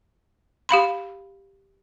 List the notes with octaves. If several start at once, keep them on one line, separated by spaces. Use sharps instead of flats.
G4 F5 B5 C6